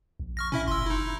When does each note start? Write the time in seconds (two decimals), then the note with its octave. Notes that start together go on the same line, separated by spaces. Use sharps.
0.20 A#1
0.37 C#6 F6 A#6
0.52 A2 C#4 E4 E5
0.68 F#1 C6 E6
0.86 D#4 E4